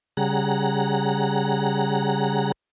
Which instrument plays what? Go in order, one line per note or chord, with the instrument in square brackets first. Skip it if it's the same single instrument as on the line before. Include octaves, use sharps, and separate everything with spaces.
[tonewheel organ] C#3 G3 G#4 F#5 A#5